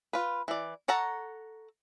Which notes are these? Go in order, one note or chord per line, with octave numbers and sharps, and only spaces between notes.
F4 B4
E3 D5
A4 C#5 F#5 A5 A#5